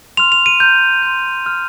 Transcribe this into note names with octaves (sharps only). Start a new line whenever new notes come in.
C6 F6 F7
F7
D#7
A#5 F6 G6
C6 G6
C6 F6